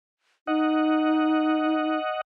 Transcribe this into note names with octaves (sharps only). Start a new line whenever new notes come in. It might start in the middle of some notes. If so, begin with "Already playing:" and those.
D#4 D#5 F#5